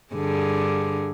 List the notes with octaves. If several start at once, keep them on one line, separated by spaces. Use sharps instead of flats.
G2 D3 G#4